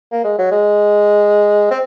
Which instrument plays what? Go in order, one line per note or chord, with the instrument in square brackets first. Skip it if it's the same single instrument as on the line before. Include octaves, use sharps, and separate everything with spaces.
[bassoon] A#3
G#3
F#3
G#3
C4